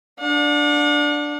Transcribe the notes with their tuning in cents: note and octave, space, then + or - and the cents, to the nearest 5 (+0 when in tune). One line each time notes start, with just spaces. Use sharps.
D4 +0 F#5 -45